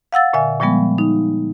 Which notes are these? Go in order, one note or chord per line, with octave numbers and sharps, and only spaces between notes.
F5 F#5 E6 A6
A#2 D3 E5 G#5
A#2 F3 G3 G#3 B3
D#4